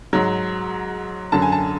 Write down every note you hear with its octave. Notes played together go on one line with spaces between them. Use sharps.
G#2 F#3
F#2 D3 F#3 A5
G#5
A5